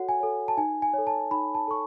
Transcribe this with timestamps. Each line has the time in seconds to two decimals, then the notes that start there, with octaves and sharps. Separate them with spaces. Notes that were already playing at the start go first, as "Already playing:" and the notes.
Already playing: F#4 A4 C#5 F#5
0.09 G#5
0.20 A4 C#5
0.48 A5
0.57 D#4 G#5
0.82 G#5
0.94 A4 C#5
1.07 A5
1.31 D#4 B5
1.55 A5
1.68 A4 C#5 C#6